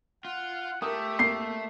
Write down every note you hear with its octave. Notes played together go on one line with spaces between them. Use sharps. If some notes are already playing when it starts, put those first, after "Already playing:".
F4 F#5
A3 G4 A#4 D#6
A#3 C7